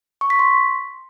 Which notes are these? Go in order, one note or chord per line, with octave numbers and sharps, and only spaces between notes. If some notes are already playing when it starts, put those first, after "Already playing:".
C#6
B6
C6